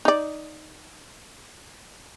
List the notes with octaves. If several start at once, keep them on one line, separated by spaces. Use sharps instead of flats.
D#4 D5